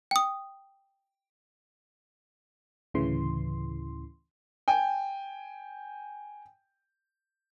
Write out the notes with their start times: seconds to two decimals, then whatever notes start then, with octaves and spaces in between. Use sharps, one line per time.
0.11 G5 D#6
2.94 D2 A2 C#3 E3 C6
4.68 G5 G#5